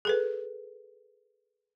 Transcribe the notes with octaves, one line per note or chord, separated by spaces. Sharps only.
G#4 A4 B4